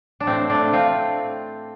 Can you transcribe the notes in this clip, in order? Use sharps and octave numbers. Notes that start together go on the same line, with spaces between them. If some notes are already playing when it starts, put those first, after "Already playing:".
D4
A2 A3 C4
A3 D4
C4 F4